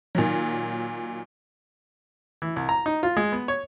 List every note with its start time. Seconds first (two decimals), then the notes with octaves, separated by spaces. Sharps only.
0.15 A#2 D#3 F#3
2.42 E3
2.56 C2
2.69 A#5
2.86 D#4
3.03 F4
3.17 G#3
3.32 B3
3.48 C#5